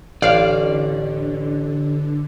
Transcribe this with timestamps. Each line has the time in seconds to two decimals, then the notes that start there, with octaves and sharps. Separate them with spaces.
0.22 A1 D3 D5 F5